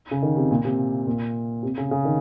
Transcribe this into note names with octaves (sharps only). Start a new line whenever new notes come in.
C#3
D#3
C3
A#2
C3
A#2
C3
C#3
C#3
D#3